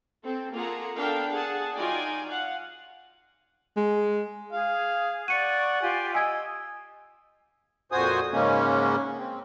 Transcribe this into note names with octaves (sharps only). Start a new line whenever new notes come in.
C4 A4
A#3 F4 G#4 A4 F#5 A#5
B3 D4 A4 A#4 F5 G5
G#4 F#5 A5
F#3 D#4 F4 D5 G5 G#5
F5 F#5
G#3
G#4 F5
D5 F#5 C#6 C#7 D#7
F4 G4 G#5
D#5 G#5 E6 G#6
F2 A#2 F#4 C5 G#5 D#6
G#2 C#3 G#3 A#3 C#4
C4